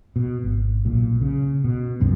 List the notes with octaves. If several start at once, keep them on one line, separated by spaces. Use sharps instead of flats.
B2
G#1
B1 A#2
C#3
B2
D1 C2 F#2 B2